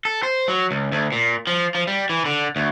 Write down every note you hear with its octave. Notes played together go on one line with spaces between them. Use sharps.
A4
C5
F#3
C#2
D2
A#2
F3
F3
G3
E3
D3
D2